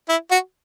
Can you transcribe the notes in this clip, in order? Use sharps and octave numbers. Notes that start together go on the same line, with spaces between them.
E4
F#4